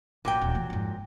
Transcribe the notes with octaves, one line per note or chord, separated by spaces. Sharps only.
A1 A#2 F#3 G5
D#1 C4
C3 E3
F2 G#2